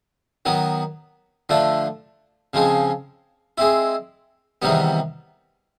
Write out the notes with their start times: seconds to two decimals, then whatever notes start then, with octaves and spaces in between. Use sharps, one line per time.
0.45 D#3 F#3 B3
1.49 D3 F3 A3 D4
2.53 C#3 F3 G#3 C4
3.58 G#3 C4 E4
4.62 E2 C3 D#3 G3 B3